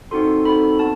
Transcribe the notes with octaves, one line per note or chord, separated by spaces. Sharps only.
C4 D#4 F#4 A4 C6
C4 D#4 F#4 A4 B5
B3 A5